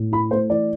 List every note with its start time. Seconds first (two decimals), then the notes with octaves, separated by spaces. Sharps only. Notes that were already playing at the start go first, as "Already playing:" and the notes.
Already playing: A2
0.12 E4 B5
0.31 A3 C5
0.50 E3 D5